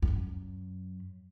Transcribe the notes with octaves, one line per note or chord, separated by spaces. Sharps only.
F2
F#2